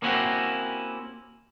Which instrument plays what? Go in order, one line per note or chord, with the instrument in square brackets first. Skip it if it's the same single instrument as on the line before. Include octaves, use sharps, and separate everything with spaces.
[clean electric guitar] A#3 C4 C#4 E4 F#4 G4